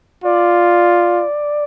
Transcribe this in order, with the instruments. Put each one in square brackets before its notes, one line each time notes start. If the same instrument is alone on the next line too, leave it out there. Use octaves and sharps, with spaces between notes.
[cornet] F4 [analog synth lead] D5